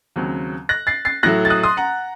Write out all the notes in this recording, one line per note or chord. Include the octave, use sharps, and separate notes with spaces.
D#2 C#3 F#3 C4
F#6 A#6
A6 C7
A6 C7
A2 F#3 A3 F#6 A#6
A6
D#6 F#6
C6 D#6
F#5 A#5